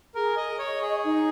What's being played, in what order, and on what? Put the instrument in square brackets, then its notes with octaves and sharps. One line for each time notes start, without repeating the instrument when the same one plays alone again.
[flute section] G#4 [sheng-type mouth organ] A#4
[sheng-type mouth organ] D#5
[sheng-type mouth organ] C#5 [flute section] D#5 C#6
[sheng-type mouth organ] G#4
[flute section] D#4